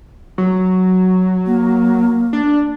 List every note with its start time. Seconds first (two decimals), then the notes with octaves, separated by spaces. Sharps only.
0.38 F#3
1.47 A#3
2.33 D4